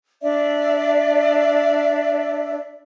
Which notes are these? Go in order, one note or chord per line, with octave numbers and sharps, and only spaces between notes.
D4 D5 E5